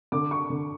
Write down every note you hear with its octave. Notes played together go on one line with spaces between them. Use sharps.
D3 D6
C#6
D3